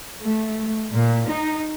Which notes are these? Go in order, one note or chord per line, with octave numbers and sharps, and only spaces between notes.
A3
A#2
D#4